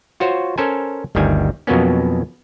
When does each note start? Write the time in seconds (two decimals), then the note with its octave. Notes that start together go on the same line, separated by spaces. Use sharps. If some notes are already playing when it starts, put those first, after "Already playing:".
0.20 F4 F#4 C5 C#5
0.58 C#4 A4 A#4 C5 G#5
1.15 G1 D2 D#3 G3 G#5
1.67 F2 B2 F#3 A#3 B3 C#4